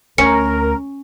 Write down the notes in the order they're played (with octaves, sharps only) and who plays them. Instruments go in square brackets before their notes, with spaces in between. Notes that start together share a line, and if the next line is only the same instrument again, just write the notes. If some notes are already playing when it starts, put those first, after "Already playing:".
[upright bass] D2 [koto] C#4 [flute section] A#4 [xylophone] C#7